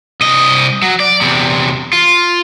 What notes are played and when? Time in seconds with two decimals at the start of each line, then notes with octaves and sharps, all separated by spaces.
0.21 C2 D#5
0.82 F#3
1.00 D5
1.21 E2 C3
1.93 F4